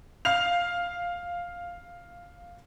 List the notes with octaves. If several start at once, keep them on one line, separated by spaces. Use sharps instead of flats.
F5 C7 F7